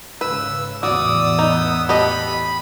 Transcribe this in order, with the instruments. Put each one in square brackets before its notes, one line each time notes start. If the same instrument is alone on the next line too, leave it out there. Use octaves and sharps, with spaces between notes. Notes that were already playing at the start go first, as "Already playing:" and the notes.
[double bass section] G#2 C#3 [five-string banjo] B4 [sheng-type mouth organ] E6
[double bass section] E2 A2 [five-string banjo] F#4 [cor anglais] D5 [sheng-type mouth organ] D#6 E6
[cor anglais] B3 [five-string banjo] D#4
[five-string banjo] G4 A4 D#5 [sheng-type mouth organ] B5